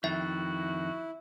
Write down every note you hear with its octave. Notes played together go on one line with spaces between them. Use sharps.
F2 D#3 E4 F#4 E5